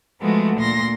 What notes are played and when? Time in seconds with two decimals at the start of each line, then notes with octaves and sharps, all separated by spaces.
0.21 F3 G#3 A3 B3 F#4
0.57 D2 A#2 C6 A#6